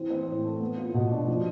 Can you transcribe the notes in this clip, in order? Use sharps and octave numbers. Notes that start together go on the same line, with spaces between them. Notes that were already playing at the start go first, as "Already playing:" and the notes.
Already playing: E3 C4
C4
A2
A3
B3
F4
B2
D4
F3